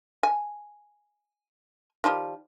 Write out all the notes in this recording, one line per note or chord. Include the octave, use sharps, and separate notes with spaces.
G#5
D#3 F3 G3